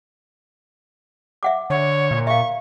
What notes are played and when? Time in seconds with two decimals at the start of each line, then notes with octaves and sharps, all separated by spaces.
1.43 E5 F#5 D6
1.70 D3 C#5
2.11 A#2
2.27 E5 F5 C#6